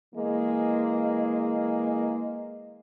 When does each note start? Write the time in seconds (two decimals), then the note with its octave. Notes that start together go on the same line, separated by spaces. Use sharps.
0.14 E3 G#3 A#3 D#5